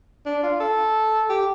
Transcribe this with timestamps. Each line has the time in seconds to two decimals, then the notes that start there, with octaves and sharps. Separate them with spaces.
0.26 D4
0.43 F4
0.60 A4
1.30 G4